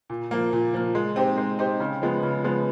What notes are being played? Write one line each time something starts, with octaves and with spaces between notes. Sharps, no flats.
A#2
F3 A#3
A#2
F3 A#3
G#3
C4 D#4 G4 C5
G#3
C4 D#4 G4 C5
C#3
F3 G#3 B3
C#3
F3 G#3 B3